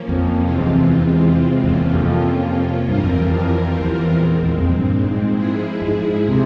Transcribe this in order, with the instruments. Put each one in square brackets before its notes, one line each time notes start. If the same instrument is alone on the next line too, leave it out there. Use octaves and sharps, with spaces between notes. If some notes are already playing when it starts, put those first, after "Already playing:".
Already playing: [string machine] F3 A#3 C#4
[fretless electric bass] F2
[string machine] C3 E3 G#3 C4 F4
[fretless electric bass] F2
E2
[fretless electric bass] E2 [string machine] C3 F3 A#3 C#4 F4
[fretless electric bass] F2
[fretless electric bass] G2 [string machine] E3 G3 C4 F4 A#4
[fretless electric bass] F2
F2
E2
[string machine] A#2 G#3 C4
[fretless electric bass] E2
F2
G2
G#2
[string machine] F3 G#3 E4 G#4
[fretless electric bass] G#2
C3